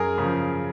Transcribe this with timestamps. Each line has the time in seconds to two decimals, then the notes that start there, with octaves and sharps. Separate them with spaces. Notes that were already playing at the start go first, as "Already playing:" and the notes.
Already playing: F#2 G#4 A#4
0.18 C#3 F3